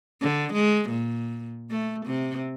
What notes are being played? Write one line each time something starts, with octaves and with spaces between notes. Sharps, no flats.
D3
G#3
A#2
A3
C3